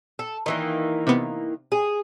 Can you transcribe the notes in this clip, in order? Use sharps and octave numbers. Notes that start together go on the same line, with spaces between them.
A4
D#3 E3 A#3
C3 B3
G#4